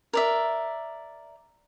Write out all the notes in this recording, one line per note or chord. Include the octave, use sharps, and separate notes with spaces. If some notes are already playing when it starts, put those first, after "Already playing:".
A#4 D5 E5